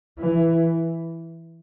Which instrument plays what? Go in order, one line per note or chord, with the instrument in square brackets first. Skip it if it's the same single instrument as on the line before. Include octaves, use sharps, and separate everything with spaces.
[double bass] E3